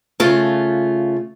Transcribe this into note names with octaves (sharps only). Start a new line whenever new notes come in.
C#3 A3 F4